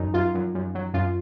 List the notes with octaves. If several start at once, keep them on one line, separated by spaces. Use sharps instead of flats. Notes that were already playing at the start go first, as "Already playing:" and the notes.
Already playing: F#2 D#4
F#2 F4
F#2
F#2
F#3
F#2 F4